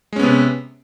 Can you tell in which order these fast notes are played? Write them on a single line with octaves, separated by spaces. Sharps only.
G#3 C#4 B3 C3